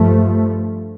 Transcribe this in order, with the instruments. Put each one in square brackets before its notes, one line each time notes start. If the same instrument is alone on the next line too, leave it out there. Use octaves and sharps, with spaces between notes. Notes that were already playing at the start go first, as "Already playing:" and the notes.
Already playing: [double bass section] G2 F3 A3